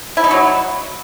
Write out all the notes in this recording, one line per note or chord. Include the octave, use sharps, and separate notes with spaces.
E4
D#4
F#3